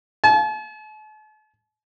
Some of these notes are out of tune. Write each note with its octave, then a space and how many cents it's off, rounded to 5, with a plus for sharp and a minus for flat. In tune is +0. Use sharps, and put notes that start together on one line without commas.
A5 -45